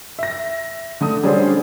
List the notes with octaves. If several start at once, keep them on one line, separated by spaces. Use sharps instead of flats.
E5 A#6
D3 A3 D#6
G3 C#4 D4 F#4 G#4 C5